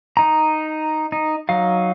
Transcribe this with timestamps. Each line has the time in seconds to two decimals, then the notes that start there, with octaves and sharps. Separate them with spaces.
0.17 D#4 A#5
1.12 D#4
1.49 F#3 D#4 F5